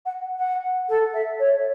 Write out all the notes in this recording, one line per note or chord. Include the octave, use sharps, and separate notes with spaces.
F#5
F#5
A4
E5
C#5